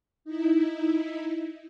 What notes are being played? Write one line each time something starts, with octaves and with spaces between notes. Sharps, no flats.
D#4 E4